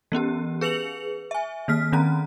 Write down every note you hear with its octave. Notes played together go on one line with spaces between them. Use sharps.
E3 B3 C#4 G4
G#4 B4 C#7 F7 F#7
E5 G#5
D#3 A#3 F6 B6
D#3 C4 C#4 A#5